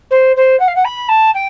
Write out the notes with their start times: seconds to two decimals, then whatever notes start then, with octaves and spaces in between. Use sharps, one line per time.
0.10 C5
0.36 C5
0.59 F#5
0.67 F5
0.75 F#5
0.84 B5
1.08 A5
1.34 G5